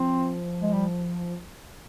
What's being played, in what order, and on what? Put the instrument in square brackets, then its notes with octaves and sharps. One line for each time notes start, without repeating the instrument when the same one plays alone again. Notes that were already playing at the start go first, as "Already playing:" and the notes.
Already playing: [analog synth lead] F3 [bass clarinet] C4
[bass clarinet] G#3
G3